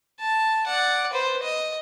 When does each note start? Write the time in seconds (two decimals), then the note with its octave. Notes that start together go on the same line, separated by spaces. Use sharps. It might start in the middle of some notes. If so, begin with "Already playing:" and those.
0.20 A5
0.67 D5 F#5
1.13 B4 C5
1.43 D#5